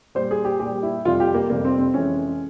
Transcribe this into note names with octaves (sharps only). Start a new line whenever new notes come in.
A#2 G3 C5
G#4
G4
A#2 G3 G4
E4
F2 C3 G3 F4
G4
A#3
F2 C3 G3 A#3
C4
C4
F2 E3 G#3 C#4